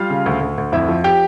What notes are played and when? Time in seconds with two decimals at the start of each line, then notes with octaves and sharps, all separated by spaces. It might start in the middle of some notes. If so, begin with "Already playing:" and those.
Already playing: G3 F4 F5
0.10 C#3
0.26 D2
0.41 D2
0.58 D2
0.72 F2 E4 E5
0.89 F3
1.04 G4 G5